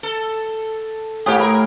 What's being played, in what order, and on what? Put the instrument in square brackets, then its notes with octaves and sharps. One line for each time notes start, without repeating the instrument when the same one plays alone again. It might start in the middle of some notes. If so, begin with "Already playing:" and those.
[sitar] A4
[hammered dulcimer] A2 G#4 [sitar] A#3 G4
[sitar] A#4 [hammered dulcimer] B5